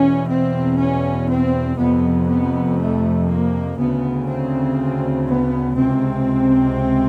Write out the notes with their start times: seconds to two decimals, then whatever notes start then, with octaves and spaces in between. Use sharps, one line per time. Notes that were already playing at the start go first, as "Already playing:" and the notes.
Already playing: E2 B2 C#4
0.28 C4
0.78 C#4
1.29 C4
1.79 F2 C3 B3
2.28 B3
2.78 A3
3.28 A#3
3.78 D2 C#3 B3
4.28 C4
5.28 B3
5.78 C#2 C3 C4